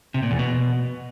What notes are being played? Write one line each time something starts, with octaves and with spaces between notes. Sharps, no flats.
C3
A#2
E2
B2